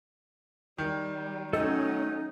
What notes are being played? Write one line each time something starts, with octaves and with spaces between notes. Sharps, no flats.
D#3 G3
F#3 A3 C#4 D#4 A4 D#5